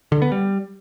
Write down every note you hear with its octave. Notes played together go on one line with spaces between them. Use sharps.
D3
B3
G3